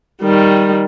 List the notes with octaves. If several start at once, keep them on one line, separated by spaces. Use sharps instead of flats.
D#3 G3